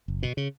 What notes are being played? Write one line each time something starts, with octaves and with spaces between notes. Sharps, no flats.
F#1
B2
C#3